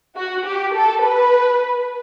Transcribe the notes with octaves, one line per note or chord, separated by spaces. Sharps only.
F#4
G4
A4
B4